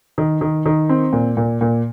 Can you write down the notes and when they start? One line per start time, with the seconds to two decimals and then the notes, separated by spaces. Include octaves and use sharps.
0.18 D#3
0.41 D#3
0.66 D#3
0.89 C4
1.13 A#2
1.37 A#2
1.61 A#2